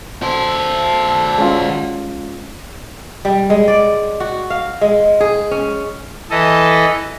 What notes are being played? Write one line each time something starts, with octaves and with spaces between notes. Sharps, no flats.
F#4 A4 C5
G#3 C#4 F4
G3
G#3
D5
F#4
F5
G#3
G#4
C#4
E3 A4 D#5